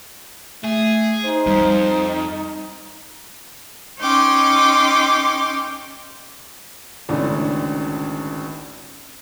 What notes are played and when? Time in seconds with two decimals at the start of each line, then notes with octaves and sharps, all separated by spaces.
0.64 A3 G#4
1.24 D#4 C5
1.46 F2 G3
4.00 C#4 D#4 G5 C6 D6
7.09 G#1 C#2 A2 D3 C#4 D4